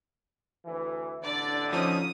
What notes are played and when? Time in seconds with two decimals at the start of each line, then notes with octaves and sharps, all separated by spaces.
0.65 D2 E3
1.24 A1 D3 D4 D5
1.73 F3 C#4 D#4 D#6